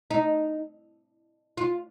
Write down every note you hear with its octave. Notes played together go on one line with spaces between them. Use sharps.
D#4
F4